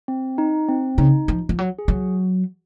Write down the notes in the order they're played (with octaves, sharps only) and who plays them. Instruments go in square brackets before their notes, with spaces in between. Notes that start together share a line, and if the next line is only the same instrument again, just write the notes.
[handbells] C4
D#4
C4
[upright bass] C#3 [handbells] D#4
[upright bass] F3
F3
F#3
[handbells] G#4
[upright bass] F#3 [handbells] F#4